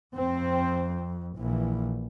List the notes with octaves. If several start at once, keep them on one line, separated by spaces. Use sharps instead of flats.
F2 C4
A#1 E3